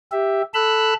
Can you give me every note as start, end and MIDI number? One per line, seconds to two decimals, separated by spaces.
0.12 0.42 67
0.12 0.42 76
0.54 0.94 69
0.54 0.94 83
0.54 0.94 88
0.54 0.94 90